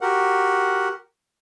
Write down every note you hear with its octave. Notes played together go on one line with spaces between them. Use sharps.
F#4 G4 A#4 F#5